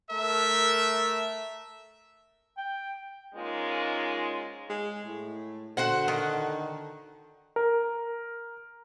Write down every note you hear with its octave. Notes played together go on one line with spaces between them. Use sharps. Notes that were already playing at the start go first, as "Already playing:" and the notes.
A3 A#4 E5
G5
G#2 G#3 A#3 C#4 D#4 F4
G#3
A2
D3 F#4 C5 F#5
D#3
A#4